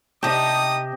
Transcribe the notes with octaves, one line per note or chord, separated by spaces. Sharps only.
C3 D#4 G4 D#5 A5 D#6